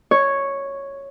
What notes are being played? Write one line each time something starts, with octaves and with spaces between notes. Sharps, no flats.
C#5